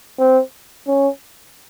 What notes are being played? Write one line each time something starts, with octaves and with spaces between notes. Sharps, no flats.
C4
C#4